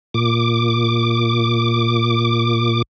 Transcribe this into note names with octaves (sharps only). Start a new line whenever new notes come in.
A#2 D6